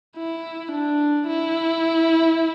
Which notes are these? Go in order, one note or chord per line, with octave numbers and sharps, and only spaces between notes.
E4
D4
E4